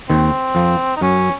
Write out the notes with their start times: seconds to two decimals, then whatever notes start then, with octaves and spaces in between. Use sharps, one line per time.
0.09 D#2 D#3 C4
0.55 F2 F3
0.97 D#4
1.01 F#2 F#3 C#4